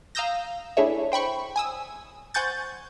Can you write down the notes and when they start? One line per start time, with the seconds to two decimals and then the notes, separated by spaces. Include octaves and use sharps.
0.15 F5 A#5 D#6 E6 G6 A#6
0.77 A3 D4 E4 G#4 C#5 E5
1.12 C5 G5 B5 C#6
1.56 G#5 D#6 E6
2.34 C5 F#5 G#5 C#6 G6 A6